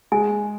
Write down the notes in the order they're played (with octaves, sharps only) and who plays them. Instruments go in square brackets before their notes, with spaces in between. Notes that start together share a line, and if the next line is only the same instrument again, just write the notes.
[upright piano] G#3 [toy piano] G#5